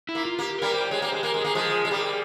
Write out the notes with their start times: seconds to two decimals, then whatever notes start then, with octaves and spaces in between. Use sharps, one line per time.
0.09 E4
0.15 A#3
0.25 F4
0.39 A#3 G4
0.58 G3 A#3 A#4
0.74 C5
0.91 G#3 C#5
1.02 A#3
1.08 G#3 C5
1.23 A#3 A#4
1.34 G#3
1.41 A#3 G#4
1.55 F3 G#3
1.85 G#3
1.91 G3 A#3